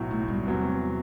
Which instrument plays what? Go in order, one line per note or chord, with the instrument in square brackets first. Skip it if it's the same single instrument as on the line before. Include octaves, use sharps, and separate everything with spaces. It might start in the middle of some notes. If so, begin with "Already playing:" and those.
Already playing: [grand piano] B1 A2 F#3
[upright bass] A3
G3
[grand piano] E2 C3 F#3